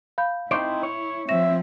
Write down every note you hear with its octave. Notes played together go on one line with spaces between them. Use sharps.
F5 B5 G6
C4 D#4 E4 C5 C#6 D6 D7
C#5
F3 C4 E5 C#6 A#6 E7